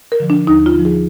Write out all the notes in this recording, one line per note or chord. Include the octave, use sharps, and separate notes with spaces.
A#4
D3 F3
D4
D#2 D#4
F4
D3 F3
G#4